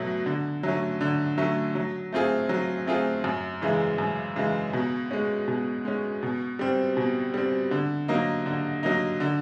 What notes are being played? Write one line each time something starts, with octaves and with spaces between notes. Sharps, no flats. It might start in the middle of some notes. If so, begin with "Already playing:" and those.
Already playing: B2 F#3 A3
D3
F#3 A3 C#4
D3
F#3 A3 C#4
F#3
A3 C4 F4 G#4
F#3
A3 C4 F4 G#4
F#2
C#3 E3 G#3
F#2
C#3 E3 G#3
B2
G#3 C#4
B2
G#3 C#4
B2
G3 C4
B2
G3 C4
D3
F#3 A#3 D#4
D3
F#3 A#3 D#4
D3